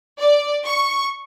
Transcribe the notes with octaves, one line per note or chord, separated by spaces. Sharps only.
D5
C#6